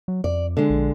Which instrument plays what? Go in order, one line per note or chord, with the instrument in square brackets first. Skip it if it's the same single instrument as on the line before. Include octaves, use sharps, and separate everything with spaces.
[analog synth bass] F#3
[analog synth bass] F2 [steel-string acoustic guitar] D5
[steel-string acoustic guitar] D3 G#3
[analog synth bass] A#1